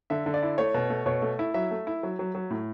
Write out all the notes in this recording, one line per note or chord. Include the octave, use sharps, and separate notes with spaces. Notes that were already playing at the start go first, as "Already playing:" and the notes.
D3 E5
D3
D5
E4
A3 C#5
B2
A3
B2 C#5
A3
E4
F#3 E5
A3
E4
F#3
F#3
F#3
A2